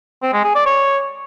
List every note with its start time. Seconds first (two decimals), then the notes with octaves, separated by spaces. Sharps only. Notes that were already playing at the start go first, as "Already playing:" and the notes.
0.22 C4
0.33 G#3
0.44 G#4
0.55 D5
0.66 C#5